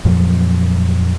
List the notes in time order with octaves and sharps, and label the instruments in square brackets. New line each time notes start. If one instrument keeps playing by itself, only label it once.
[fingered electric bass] F2 A#2 F3 F#3